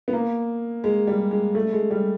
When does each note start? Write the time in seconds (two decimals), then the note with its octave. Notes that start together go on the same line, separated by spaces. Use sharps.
0.08 B3
0.13 A#3
0.84 G#3
1.07 G3
1.31 G#3
1.55 A3
1.73 G#3
1.91 G3